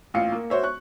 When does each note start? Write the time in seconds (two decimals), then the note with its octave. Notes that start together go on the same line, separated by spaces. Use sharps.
0.14 A1 A#2 F5 C#7
0.32 A#3
0.50 F#4 C5 C#5 E5
0.63 C#6 F#6